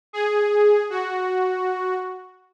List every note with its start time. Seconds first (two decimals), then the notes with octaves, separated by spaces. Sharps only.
0.13 G#4
0.90 F#4